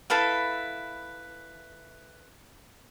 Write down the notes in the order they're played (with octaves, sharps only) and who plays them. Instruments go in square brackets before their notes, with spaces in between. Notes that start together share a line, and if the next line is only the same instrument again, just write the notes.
[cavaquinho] E4 A4 B4 F5